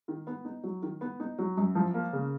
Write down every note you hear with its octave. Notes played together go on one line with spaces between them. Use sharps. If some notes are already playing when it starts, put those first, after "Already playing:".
D#3
B3
D#4
F#3
D#3
B3
D#4
F#3
F#2
F3
A#3
C#3